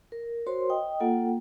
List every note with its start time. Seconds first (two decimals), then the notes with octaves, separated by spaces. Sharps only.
0.12 A#4
0.47 F#4 A#4 C5 C#5 C6
0.70 D#5 G5 D#6
1.00 A#3 F4 A4 F#5 G5